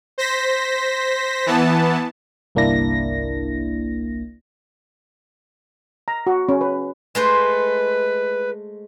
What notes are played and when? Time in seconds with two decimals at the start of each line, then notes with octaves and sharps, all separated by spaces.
0.18 C5 A#6 B6
1.46 E3 B3 A5
2.55 G1 C2 A#3 D4 E4 A#6
6.08 A#5
6.27 F#4
6.49 C#4
6.61 B4
7.15 G#3 A3 B4 C5